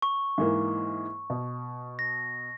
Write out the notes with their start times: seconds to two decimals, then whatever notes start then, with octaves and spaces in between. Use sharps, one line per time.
0.02 C#6
0.38 G#2 E3 A#3
1.30 B2
1.99 A#6